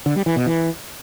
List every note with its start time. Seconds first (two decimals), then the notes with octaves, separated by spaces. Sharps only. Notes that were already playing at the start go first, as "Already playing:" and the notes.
0.06 D3
0.16 G3
0.26 E3
0.36 B2
0.46 E3